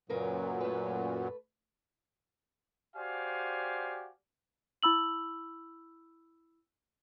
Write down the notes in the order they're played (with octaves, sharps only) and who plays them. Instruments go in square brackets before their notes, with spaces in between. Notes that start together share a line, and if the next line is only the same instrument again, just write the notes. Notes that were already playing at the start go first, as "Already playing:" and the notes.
[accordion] F#2 A#2 F#3 [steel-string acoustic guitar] C#3 A#4 B4
[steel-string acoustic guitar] A3 B4
[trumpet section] F#4 G4 C5 D5 F5 G#5
[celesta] E4 B5 E6 F#7